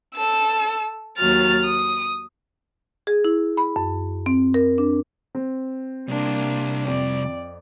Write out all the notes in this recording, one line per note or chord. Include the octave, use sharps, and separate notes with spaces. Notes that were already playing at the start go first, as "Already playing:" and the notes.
A4 E6
D#2 F#3 F6 A6
D#6
G#4
E4
B5
F#2
C4
A#4
D4
C4
C2 A#3 D4
F2 D5